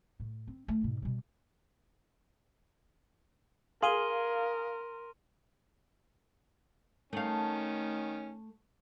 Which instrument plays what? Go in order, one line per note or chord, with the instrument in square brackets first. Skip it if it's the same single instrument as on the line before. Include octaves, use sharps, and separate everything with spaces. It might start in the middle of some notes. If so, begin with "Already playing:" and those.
[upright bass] A2
C4
A3
G#2 B2
B2 G3
[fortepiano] G#4 [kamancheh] A#4 [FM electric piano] F5 [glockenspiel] C6 D#7 G7
[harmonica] D#3 C#4 [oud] A3 F5